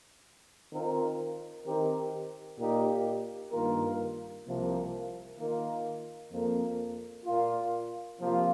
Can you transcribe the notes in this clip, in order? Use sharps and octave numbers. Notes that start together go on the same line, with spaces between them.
D#3 C4 F4 A#4
D#3 C4 G4 A#4
A#2 A#3 D#4 G4
G2 D#3 A#3 F4 A#4
C2 C3 F3 A#3
D#3 A#3 F4 A#4
F2 F3 A#3
A#2 A#3 F4
C3 F3 A#3 F4